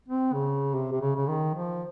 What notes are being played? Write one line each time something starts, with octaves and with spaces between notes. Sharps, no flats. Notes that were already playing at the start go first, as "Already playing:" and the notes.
C4
C#3
C3
C3
C#3
C#3
D#3
F3